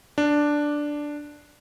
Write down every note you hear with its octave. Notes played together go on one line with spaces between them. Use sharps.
D4